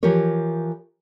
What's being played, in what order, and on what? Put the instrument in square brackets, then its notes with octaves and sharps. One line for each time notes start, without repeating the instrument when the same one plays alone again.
[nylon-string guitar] E3 F3 G4 A#4 C#5